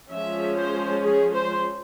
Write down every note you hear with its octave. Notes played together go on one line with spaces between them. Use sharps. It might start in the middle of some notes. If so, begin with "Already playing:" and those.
F3 G#3 C#4 E5
C5
G#4
C5